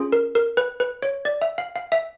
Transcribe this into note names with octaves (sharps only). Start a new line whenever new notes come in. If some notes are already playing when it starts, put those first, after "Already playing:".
Already playing: C#4 F4 G#4
A#4
A#4
B4
B4
C#5
D5
E5
F5
F5
E5